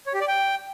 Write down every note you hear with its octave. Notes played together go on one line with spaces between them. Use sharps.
C#5
G4
D5
G5